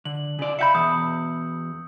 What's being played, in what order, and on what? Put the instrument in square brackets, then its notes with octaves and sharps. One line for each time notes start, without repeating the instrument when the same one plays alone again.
[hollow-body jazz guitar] D3 [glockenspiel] F#7
[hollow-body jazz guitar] C#3 D5
[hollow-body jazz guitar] E5 F5 B5 [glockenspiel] G6 C#7
[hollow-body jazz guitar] E2 B2 [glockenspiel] D#6 E6 G6